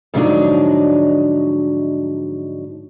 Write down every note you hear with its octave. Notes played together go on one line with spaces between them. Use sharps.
G#2 D3 F3 F#3 D4 D#4